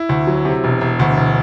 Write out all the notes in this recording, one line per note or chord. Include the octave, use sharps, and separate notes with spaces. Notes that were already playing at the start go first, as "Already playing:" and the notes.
Already playing: E4
D2
F#3
C3
E1
E1
D2
E1